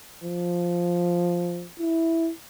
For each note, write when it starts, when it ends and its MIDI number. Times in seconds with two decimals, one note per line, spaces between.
0.24 1.66 53
1.80 2.31 64